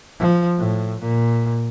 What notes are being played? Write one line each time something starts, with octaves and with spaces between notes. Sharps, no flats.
F3
A2
A#2